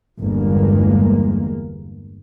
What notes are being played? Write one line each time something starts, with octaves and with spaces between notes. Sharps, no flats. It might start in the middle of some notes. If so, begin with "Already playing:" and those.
G1 E2 G2 G#3 A#3